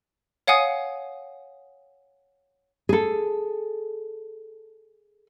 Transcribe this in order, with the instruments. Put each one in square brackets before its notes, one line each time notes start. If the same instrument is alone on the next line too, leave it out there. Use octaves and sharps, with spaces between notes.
[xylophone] C#5 F5 F#5 G#5 D#6
[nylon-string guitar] G#4 A4